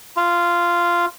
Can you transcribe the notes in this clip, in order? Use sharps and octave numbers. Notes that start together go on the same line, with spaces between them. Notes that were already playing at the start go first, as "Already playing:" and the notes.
F4